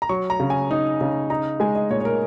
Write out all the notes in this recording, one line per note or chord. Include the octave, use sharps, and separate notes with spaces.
A#5
F#3 C#6
A#5
C#3
G#5
D#4
C#3
D#4 A#5
G#3 G#5
D#5
A#2 C#5
C#5
A#4